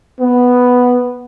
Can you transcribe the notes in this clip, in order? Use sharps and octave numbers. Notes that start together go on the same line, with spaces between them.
B3